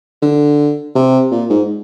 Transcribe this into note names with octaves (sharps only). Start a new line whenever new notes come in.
D3
C3
A#2
G#2